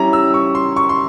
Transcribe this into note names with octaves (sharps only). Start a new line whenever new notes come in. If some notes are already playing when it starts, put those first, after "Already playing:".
Already playing: G3 C#4 E4 A#5
E6
C#6
C6
C#6
C6